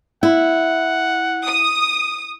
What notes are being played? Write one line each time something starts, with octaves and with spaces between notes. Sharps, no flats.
E4 F#5
D#6